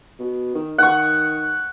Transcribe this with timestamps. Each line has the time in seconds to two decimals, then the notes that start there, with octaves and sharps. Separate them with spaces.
0.19 B2
0.55 D#3
0.78 D#3 F#5 C#6